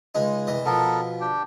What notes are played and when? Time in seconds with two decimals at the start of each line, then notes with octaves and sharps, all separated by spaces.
0.15 C#2 G#3 D#4
0.47 C2 E3 D#5
0.66 B2 F3 B3 A4 A#4
1.21 D4 G4 G5